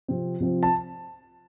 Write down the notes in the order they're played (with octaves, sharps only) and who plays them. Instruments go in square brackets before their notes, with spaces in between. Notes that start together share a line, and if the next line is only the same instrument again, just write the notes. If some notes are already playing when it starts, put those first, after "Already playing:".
[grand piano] C3 F3 C4
C3 F3 C4
A5